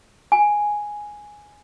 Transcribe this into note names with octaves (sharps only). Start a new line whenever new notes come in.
G#5